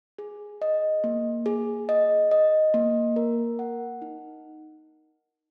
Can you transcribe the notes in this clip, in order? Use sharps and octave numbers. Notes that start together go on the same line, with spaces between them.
G#4
D#5
A#3
G#4
D#5
D#5
A#3
A#4
F#5
D#4